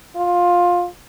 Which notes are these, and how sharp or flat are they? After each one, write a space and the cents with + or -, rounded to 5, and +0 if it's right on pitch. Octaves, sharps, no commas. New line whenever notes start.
F4 +15